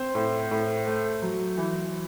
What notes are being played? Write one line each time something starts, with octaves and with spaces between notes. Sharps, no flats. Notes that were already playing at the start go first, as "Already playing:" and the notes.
Already playing: C4 C5
A2
A2
A3
F#3
E3